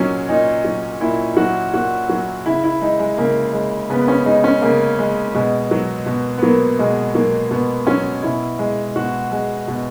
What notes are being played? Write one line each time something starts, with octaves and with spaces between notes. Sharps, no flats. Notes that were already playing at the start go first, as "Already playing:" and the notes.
Already playing: A#2 F#3 C#4 D#4
A#2 D#4
F#3
A#2 E4
F#3 F#4
A#2 F#4
F#3
C#3 E4
E4
G#3 D#4
G#3
C#3 A#3
G#3
C#3 B3
B3
C#4
G#3 D#4
C#4
C#3 A#3
G#3
B2 G#3
F#3
B2
B3
F#3 A#3
B2 G#3
F#3 A#3
B2 B3
F#3 C#4
B2 E4
G#3
B2 F#4
G#3
B2